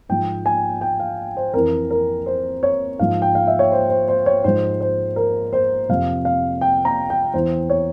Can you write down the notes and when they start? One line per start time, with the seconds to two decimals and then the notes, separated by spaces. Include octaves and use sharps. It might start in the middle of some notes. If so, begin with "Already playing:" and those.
0.09 G#2 F3 G5
0.46 G#5
0.81 G5
1.00 F5
1.37 C5
1.54 F2 E3 A#4
1.90 A#4
2.26 C5
2.63 C#5
2.99 G#2 F3 F5
3.22 G5
3.35 F5
3.47 E5
3.59 C#5
3.72 C5
3.90 C5
4.08 C5
4.26 C#5
4.44 G#2 F3 C5
4.81 C5
5.16 A#4
5.53 C5
5.89 F2 C3 F3 F5
6.25 F5
6.61 G5
6.85 A#5
7.10 G5
7.34 E2 E3 C5
7.70 C#5